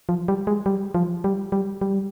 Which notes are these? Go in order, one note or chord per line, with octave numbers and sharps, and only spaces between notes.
F3
G3
G#3
G3
F3
G3
G3
G3